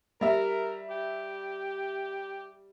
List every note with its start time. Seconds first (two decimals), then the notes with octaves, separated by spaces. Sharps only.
0.21 G3 A#4 E5
0.90 G4